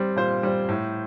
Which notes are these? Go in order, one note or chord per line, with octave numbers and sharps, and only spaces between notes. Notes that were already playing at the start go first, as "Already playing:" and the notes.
Already playing: G3 C4
A#2 C5
G3 C4
A2